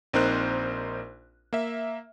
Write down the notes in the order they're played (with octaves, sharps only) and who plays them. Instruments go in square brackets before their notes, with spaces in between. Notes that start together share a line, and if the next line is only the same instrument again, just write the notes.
[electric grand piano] A#1 C4 D#4 A#4 C5 F#6
A#3 E5